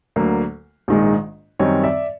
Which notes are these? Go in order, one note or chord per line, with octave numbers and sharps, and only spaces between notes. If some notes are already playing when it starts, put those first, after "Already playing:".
D2 D3 F#3 A#3
A#1 G#2 D#3 G#3
F#2 D#3 G3 C4 C#5 D#5
D5 E5